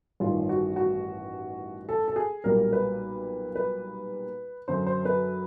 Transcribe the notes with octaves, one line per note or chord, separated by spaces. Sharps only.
A1 G2 D#3 F4
F#4
F#4
A4
A4
G#4
B1 A#2 G3 A#3 A#4
B4
B4
F#2 D3 F#3 C5
C5
B4